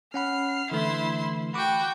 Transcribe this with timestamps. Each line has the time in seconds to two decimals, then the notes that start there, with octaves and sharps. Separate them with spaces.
0.14 C#4 F#5 B5 F6 C7
0.71 D3 E3 A3 E4 C6
1.54 F#4 G5 B5 D6